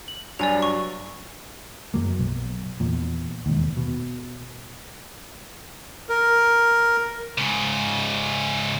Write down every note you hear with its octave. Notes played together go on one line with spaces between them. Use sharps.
F#7
G2 F#3 D4 D5 G#5 F7
C#6
F#2 F#3 A#3
B1
E2 A#2
E1 D#2
B2
A#4
G#2 C#3